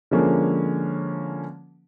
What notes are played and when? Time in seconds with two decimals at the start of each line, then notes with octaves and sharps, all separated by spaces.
0.11 D3 F3 G#3 A#3 C#4